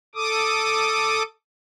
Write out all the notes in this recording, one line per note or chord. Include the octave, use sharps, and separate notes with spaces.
A4 D6 D#6